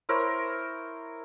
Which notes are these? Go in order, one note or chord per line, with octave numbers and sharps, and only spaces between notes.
E4 A#4 C5 C#5